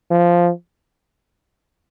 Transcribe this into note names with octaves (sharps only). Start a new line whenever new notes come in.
F3